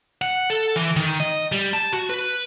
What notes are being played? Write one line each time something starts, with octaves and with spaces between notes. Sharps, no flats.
F#5
A4
E3
D#3
D#5
G3
A5
F#4
B4